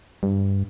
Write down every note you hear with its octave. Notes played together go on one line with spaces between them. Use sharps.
G2